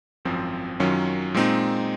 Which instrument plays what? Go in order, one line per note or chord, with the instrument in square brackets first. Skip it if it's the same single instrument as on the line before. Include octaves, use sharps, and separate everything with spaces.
[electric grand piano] G#1 F#2 F3 C4
F#2 D#3 F#3 C#4 F4
A#2 G#3 C4 D#4